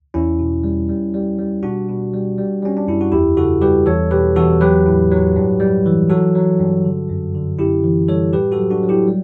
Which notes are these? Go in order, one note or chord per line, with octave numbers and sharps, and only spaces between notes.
E2 C#4 E4
B2
G3
G3
G3
G3
B2 D4 F#4
B2
G3
G3
G3 C#4
D4
F#2 E4
F#4
E2 E4 G4
C#3 F#4 A4
G3 G4 B4
E2 A4 C#5
B2 G4 B4
E2 F#4 A4
F#3 G4 B4
A2
F#3
G2
G3
E3
F#3 F#4 A4
F#3
G2
D3
F#2
D3
F#2 E4 G4
E3
G3 A4 C#5
A2 G4 B4
F#4 A4
F#3
D4 F#4
F#3
E4 G4
G3